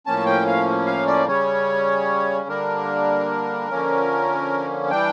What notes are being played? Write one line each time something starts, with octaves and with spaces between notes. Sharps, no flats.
A2 F3 A#3 C#4 A5
G5
F5
F5
D5
C#3 G3 C#4 C#5
D3 G3 A#3 D4 A#4
D3 F3 A#3 C#4
E3 G3 D4 G5